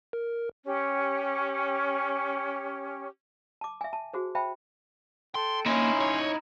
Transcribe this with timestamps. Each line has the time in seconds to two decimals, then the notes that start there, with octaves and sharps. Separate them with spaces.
0.13 A#4
0.66 C#4 G4
3.61 A5 D6
3.81 E5 G#5
3.93 A5
4.13 F#4 G#4 C5
4.35 C5 E5 G5 A5 B5
5.35 A4 G5 C6
5.66 A#3 C#4 D#4 E4 C6
6.01 C#5